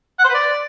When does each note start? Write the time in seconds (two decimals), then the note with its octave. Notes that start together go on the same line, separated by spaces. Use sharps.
0.19 F#5
0.24 C5
0.29 B4
0.34 D5